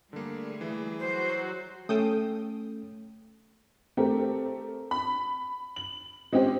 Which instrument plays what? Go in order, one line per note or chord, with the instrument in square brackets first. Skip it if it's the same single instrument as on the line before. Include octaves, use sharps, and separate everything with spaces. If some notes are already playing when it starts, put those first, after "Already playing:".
[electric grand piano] D3 A#3 [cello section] G3 A3 G#4
[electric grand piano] E3
[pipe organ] F#3 F#4 [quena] C5
[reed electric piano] A3 C#4 [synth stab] A4 G5 D#6
[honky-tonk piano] A3 C4 G4 A#4
B5
F#7
G#3 C4 C#4 G4 C5